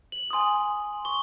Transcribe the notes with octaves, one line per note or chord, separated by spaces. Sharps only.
F#7
G#5 C6 D#6
C#6 G7